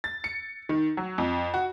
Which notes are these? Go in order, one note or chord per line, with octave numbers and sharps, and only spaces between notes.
A6
C#7
D#3
F#3
F2
F#4